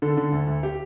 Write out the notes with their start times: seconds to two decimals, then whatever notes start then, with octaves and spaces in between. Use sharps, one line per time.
0.02 D3 A4
0.17 D3
0.32 D2
0.47 D2
0.63 G4